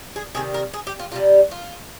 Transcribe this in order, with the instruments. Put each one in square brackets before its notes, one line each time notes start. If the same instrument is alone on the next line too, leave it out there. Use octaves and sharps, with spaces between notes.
[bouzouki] G#4
C3 D#3 G3 G#4
A#4
G#4
G4
F4
C3 G3 F4
F4